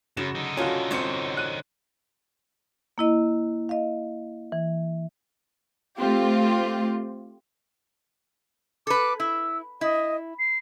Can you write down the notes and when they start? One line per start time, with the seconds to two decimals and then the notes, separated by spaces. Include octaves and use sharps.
0.17 F#2 C#3 F#3 F#4 E7
0.35 D3 D#4
0.57 D#3 C#4 F4 F#4 A4
0.91 G1 C4 A4 C5 C#5 C#7
1.37 F#6 D#7
2.98 A#3 E4 D#5
3.69 D#5 F5
4.52 E3
5.97 A3 C4 F4 G4
8.87 A4 B4 D6
9.20 E4 E6
9.81 E4 D#5
10.39 C7